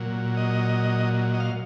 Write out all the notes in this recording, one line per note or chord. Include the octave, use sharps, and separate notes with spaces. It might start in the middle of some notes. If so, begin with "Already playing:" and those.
Already playing: A#2 F#3
D#5
D#5
F5